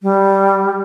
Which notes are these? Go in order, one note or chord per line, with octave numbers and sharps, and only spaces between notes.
G3